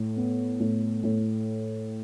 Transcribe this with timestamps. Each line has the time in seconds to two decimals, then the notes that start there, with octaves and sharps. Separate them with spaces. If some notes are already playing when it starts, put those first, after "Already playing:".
Already playing: A2
0.16 B3
0.60 A2
1.03 A2